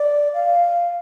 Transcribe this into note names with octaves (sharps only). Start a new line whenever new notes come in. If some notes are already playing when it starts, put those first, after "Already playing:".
Already playing: D5
F5